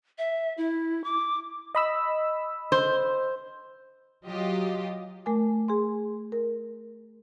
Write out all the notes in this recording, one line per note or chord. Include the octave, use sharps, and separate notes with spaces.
E5
E4
D6
D#5 B5 E6
C5
F#3 F4 G4 D#5
A3 A#4 G#5 D6
G#4 G#5 C6
A#4